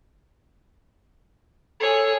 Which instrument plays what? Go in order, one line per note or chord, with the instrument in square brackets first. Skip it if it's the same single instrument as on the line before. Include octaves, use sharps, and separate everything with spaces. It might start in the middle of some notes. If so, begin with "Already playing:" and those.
[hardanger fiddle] G#4 C#5 [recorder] A4